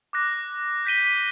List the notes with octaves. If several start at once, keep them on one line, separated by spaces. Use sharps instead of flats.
D6 F#6 A#6
G6 B6 D#7 G7